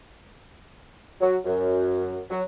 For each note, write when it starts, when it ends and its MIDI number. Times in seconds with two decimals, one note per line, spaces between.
1.20 1.36 54
1.45 2.20 42
2.30 2.41 54